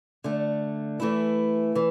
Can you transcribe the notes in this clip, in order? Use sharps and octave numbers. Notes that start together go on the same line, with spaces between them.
D3 A3 D4
E3 A3 E4
E3